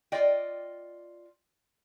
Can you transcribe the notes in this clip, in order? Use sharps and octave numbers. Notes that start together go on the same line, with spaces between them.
F4 D5 D#5 G5